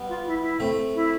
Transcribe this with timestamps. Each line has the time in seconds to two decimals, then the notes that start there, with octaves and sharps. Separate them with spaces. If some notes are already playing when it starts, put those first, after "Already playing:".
Already playing: G3 B3
0.08 F4
0.26 E4
0.41 E4
0.60 A3 C4
0.94 E4